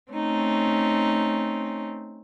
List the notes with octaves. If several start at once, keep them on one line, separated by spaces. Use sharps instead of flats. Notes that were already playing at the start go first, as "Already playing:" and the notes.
A3 C4 C#4 D#4